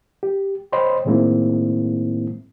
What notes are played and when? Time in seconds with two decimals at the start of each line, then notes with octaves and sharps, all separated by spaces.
0.23 G4
0.72 C5 C#5 D#5 G5 B5 C6
1.05 A2 D#3 G#3 A#3 C4 E4